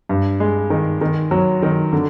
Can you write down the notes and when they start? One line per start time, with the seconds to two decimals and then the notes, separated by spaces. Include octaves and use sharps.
0.09 G2
0.40 G#3
0.70 D#3
1.01 D#3
1.31 F#3
1.62 D#3
1.93 D3